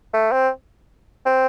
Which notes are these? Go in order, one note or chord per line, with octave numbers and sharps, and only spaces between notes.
A3
C4
C4